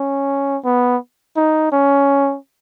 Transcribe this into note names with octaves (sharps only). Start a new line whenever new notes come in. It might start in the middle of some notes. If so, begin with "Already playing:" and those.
Already playing: C#4
B3
D#4
C#4